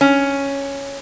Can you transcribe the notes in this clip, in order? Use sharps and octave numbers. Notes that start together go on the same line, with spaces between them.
C#4